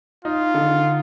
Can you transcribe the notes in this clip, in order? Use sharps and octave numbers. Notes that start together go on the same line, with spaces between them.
D#4 F4
D3